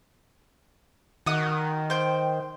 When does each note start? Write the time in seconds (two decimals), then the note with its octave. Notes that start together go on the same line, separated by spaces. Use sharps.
1.26 D#3 F#4 D#5 D#6
1.90 C5 G5